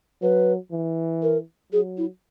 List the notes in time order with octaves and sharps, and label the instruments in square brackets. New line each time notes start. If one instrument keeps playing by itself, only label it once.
[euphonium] F#3 [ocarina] B4
[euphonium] E3
[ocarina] A#4
[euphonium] F#3 [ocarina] G#4
[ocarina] E4